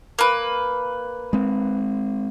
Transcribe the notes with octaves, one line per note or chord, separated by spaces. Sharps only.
A#3 B4
G#3 C4